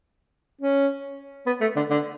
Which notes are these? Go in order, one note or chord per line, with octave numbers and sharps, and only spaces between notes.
C#4
B3
A3
D3
D3